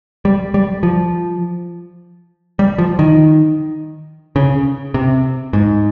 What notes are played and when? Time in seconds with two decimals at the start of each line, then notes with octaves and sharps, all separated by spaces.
0.25 G3
0.54 G3
0.83 F3
2.59 G3
2.78 F3
2.99 D#3
4.36 C#3
4.94 C3
5.53 G#2